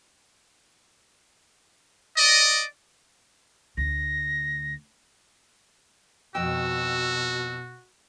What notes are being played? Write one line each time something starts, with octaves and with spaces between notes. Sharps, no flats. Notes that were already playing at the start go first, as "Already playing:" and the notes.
D5 D#5
D2 A#6
F2 B2 F#4 D#5 G5 E6